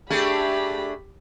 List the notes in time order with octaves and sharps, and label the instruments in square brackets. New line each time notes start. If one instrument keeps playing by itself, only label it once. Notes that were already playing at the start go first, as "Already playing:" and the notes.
[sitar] A3 D4 G#4 [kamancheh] G4 B5